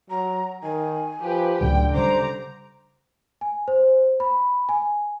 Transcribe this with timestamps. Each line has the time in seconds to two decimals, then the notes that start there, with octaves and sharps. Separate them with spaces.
0.10 F#3 A#5
0.63 D#3 G#5
1.22 F3 G4 B4
1.61 C#2 A2 D3 F#3 G5
1.95 C#3 G3 C5 A#5 D6
3.41 G#5
3.68 C5
4.20 B5
4.69 G#5